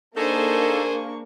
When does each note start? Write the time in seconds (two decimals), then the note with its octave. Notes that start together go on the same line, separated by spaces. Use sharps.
0.17 A#3 D4 D#4 G#4 A4 C5 C#6